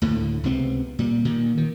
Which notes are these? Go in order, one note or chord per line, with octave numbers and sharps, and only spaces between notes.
D2 A2 D3
C#2 C3 B3 C4
A#2 G3
A#2 D#3
D#3